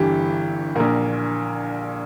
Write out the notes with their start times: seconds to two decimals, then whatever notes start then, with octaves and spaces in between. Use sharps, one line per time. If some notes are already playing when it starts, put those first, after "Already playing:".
Already playing: G1 G2 E3 G4
0.75 A#1 A#2 A#4